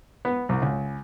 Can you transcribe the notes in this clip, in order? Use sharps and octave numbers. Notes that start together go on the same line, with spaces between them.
B3
C2
C#2